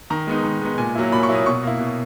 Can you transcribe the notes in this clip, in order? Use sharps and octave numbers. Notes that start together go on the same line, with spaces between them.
D#3 A#5
G#3 B3 D#4
D#3
G#3 B3 D#4
A#2 G#5
F#3 A#3 E4
A#2 B5
C#6
F#3 A#3 E4
D#6
B2 C#6
A#3 E4
B2